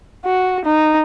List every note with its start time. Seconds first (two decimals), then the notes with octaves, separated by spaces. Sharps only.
0.25 F#4
0.65 D#4